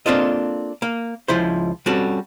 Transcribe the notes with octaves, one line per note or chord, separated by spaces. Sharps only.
A#3 C4 D4 F4 A4 D#5
A#3
C#2 F3 E4 C5
G3 C4 C#4 F#4 A4